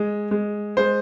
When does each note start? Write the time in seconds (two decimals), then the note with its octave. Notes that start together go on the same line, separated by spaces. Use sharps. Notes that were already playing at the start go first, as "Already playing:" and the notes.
Already playing: G#3
0.31 G#3
0.77 G#3 C5